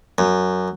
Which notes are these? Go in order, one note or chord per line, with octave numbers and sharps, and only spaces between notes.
F#2